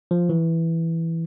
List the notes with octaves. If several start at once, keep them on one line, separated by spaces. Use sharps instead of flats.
F3
E3